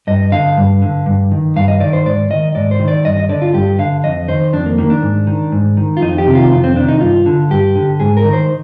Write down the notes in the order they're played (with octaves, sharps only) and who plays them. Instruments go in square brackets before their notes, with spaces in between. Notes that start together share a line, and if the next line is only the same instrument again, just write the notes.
[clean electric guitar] G2 D#5
D3 F5
G2
D3
G2
D#3
G2 F5
D#5
D#3 D5
C5
G#2 D5
D#3 D#5
G#2 D5
C5
D#3
D5
G2 D#5
D#5
D3 D5
F4
G2 G4
D3 F5
F2 D#5
D#3 C5
F2 D4
A#3
D#3 A#3
D4
G#2
D#3
G#2
D#3
F4
F2 D#4
G4
C3 D#3
F4
F2 F4
C4
C3 D4
D#3
D#4
G2 F4
D3
G2 G4
D3
G#2 G#4
A#4
D#3
C5